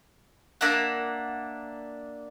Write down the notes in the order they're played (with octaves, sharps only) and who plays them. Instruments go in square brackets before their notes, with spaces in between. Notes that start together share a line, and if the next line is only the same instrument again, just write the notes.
[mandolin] A#3 D4 E5 F#5